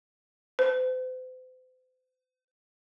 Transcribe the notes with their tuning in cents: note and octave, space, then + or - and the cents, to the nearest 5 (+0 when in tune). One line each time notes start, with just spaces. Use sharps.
C5 -40